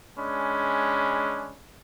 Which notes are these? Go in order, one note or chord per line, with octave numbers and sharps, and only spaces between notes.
G#3 C#4 D4 B5